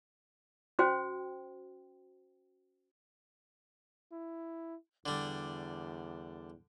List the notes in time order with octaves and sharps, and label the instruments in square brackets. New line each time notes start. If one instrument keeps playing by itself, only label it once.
[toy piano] C#4 F#4 C5 G5
[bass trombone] E4
[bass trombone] E2 [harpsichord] D3 G3